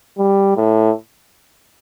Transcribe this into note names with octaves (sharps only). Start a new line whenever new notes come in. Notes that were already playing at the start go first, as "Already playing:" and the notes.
G3
A2